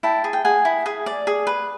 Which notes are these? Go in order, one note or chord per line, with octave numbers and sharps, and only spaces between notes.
E4 G5 A5
G#4
G5
G#4 F#5 G#5
E4
G#4
D5
G#4
B4